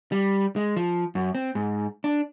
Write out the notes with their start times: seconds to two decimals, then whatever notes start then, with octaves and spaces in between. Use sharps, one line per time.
0.12 G3
0.56 G#3
0.76 F3
1.15 F#2
1.35 C4
1.55 G#2
2.04 D4